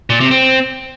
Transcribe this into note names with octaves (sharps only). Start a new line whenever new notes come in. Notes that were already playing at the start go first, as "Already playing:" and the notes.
A#2
C3
C4